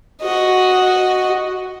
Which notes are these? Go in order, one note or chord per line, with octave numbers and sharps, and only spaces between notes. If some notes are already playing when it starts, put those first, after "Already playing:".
F#4 D#5